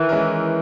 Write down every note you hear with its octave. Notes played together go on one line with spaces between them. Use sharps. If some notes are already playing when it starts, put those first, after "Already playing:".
Already playing: D#3 E3
G#3 C#4 E4 A#4